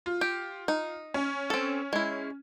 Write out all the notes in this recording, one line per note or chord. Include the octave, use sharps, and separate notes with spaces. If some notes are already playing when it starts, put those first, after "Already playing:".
F4
G4
D#4
C#4
C4 A4
G#3 E4